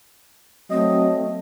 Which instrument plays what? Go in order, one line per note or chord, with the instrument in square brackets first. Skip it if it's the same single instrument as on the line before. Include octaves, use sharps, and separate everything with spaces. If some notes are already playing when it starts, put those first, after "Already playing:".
[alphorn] F#3 [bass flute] A3 [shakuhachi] C4 [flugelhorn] D#5